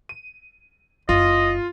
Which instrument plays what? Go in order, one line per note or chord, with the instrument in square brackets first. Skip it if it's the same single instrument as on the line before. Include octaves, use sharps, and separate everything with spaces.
[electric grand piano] D#7
[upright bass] F#1 [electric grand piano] F4 [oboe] D#5